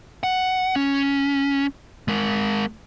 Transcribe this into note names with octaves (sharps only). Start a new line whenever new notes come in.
F#5
C#4
G#3 A#4